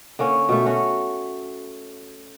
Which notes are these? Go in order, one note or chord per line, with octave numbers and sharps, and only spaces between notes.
D3 A#3 C#4
B2 A3
C#4 F#4